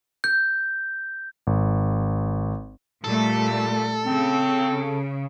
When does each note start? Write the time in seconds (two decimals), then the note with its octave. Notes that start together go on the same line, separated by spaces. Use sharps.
0.24 G6
1.47 G#1
3.04 A#2 G3 A3 A4
4.06 C#3 C4